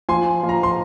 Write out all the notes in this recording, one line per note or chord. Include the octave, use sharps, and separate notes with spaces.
F3 G#5 C6
F3
A#5
C6